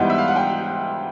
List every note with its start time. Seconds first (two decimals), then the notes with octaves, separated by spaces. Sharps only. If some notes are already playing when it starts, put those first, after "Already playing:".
Already playing: G#2 E3 G3 B3 D#4 F#5
0.10 E5
0.18 F5
0.28 F#5
0.36 G5